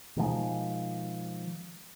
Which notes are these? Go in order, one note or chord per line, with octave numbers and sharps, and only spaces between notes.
B2 D#3 F3 G#3